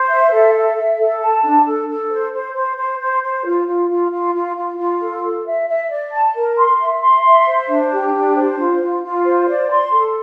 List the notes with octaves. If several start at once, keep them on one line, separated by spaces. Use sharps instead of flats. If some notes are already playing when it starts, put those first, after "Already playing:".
Already playing: C5
E5
A4
E5
E5
A4
A5
D4
A4
A4
C5
C5
C5
C5
C5
C5
F4
F4
F4
F4
F4
F4
F4
A4
A4
E5
E5
D5
A5
A#4
C6
E5
C6
E5
C5
D4
G4
D4
C5
F4
F4
F4
C5
D5
C6
A4